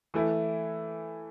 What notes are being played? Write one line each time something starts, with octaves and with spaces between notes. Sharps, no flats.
E3 A3 E4